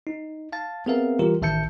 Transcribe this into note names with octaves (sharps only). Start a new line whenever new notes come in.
D#4
F5 A5 A6
B3 C4 G#4 A#4 E5 F5
E3 G3 F4 G4 A#4
A1 D#3 E5 A5 G6 C#7